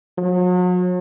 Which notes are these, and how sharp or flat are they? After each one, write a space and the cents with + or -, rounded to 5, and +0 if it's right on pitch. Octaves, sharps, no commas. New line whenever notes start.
F#3 -40